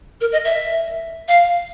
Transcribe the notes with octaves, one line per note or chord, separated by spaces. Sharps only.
A#4
D#5
E5
F5